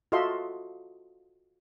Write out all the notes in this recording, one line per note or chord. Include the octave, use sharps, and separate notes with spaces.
F4 F#4 A4 D#5 E5 C6